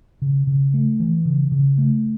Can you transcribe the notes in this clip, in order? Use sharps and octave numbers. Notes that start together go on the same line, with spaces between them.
C#3
C#3
A3
E3
C#3
C#3
A3